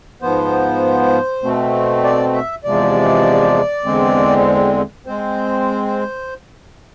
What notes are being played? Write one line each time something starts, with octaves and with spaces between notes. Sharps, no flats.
G#2 F3 B3 C5
B2 A3 C4
D5
E5
E2 C3 F3 G#3 D5
E2 D3 G#3 C4
G#3 C4 C5